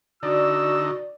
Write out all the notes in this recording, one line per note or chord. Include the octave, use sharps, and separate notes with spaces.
D3 D#4 F#4 D5 E6